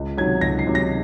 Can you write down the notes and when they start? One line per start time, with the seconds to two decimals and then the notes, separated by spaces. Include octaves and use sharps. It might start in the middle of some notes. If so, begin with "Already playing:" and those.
Already playing: C#2
0.17 C3 D#3 F#3 G#6
0.41 C#2 A#6
0.59 C7
0.67 C3 D#3 F#3
0.75 A#6